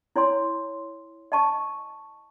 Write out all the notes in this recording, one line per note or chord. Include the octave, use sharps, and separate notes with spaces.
E4 C#5 G#5 C6
D#5 G#5 A5 C#6